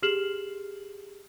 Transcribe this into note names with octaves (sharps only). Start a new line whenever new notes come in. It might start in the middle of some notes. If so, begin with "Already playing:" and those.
G4 G#4 F6 C7 E7 F#7